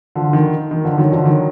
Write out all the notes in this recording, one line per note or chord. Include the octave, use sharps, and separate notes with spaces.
D3 F3
D#3
D#3
D3 F3
D#3 F#3
D3 F3
D#3 F#3